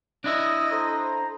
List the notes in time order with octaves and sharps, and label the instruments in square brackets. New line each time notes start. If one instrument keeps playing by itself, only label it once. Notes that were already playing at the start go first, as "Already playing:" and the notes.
[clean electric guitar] D4 E4 E5 [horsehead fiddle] D#5
[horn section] A4 C5 A#5